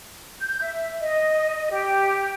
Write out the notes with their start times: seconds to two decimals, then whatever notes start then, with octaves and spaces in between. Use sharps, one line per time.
0.42 G6
0.62 E5
1.01 D#5
1.72 G4